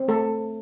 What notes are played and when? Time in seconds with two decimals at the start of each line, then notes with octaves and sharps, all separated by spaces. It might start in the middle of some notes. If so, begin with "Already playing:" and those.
Already playing: C4
0.08 A3 A4